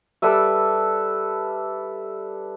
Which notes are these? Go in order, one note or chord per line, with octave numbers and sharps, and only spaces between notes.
G3 A4 B4 E5